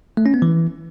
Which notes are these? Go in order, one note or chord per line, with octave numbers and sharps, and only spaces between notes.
A3
C#4
B3
E3